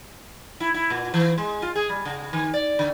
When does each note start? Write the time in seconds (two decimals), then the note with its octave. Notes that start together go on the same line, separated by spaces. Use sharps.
0.60 E4
0.74 E4
0.90 A#2
1.14 E3
1.38 G#3
1.62 F4
1.75 G#4
1.89 G3
2.05 C#3
2.33 D#3
2.54 D5
2.79 D3